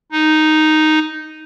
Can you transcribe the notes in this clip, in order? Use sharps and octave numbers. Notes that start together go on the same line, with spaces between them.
D#4